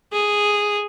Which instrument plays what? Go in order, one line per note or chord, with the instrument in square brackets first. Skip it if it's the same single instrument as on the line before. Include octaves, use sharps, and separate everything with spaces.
[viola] G#4